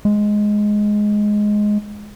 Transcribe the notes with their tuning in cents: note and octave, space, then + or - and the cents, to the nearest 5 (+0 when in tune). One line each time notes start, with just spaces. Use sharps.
G#3 +5